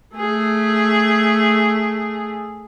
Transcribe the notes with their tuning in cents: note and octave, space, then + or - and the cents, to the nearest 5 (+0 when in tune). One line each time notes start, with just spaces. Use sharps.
A3 +0 G#4 +0